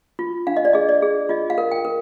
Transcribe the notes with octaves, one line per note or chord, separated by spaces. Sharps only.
F4
D4 F5
D#5
D5
G#4 D#5
D5
G#4
F4 D#5
F5
A#4
G5
A#4